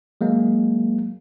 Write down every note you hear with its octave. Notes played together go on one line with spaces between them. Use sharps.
F#3 G#3 A#3